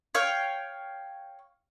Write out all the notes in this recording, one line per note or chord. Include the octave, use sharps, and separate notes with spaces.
C#5 F5 G5